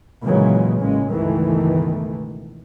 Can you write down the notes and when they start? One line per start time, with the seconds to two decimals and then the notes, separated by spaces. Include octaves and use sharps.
0.22 D#2 A#2 C#3 E3 F#3 G#3
0.79 A1 A#2 G#3 C#4
1.12 C#2 G2 B2 D#3 E3 A3